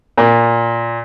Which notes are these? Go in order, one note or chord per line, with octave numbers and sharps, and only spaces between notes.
A#2